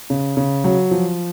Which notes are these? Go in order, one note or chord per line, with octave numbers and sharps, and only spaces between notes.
C#3
C#3
F#3
F3